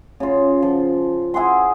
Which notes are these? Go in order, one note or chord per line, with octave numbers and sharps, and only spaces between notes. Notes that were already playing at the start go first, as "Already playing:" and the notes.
C#3 F4
F3
E4 G#4 F#5 C6